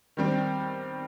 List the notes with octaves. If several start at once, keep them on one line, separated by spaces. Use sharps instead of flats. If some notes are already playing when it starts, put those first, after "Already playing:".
D#3 G3 C4